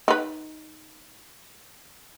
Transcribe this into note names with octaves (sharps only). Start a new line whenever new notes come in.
D#4 B4